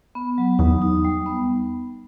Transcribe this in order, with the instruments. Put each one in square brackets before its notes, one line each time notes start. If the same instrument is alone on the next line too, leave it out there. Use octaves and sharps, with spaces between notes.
[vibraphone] B3
F#3
[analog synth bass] E2 [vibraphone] D#4
[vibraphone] D#4
G3
B3